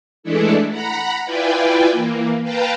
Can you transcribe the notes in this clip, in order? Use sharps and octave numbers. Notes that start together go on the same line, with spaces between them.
E3 G#3 A3 D4 E4 A4
F#5 A#5 B5
E4 F4 B4 D5 G5 G#5
E3 A#3
B4 F5 G5 A5 A#5